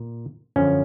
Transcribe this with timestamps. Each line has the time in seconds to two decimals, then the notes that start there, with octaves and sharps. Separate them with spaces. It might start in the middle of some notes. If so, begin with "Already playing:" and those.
Already playing: A#2
0.56 F#2 D3 F3 C#4